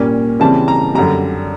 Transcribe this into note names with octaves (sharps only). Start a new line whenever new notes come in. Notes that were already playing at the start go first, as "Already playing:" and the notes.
Already playing: A#2 G3 A#3 C#4
C#3 E3 G3 C4 A5
A#5
F#2 D3 G3 A#5